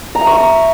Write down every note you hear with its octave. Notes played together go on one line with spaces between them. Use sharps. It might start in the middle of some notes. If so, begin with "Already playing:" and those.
A#5
E5
C#6
A#5